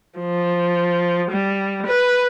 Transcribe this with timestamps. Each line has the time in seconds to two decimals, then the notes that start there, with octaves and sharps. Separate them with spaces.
0.19 F3
1.31 G3
1.86 B4